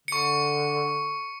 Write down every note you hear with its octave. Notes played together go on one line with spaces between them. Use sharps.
D3 C#6 C#7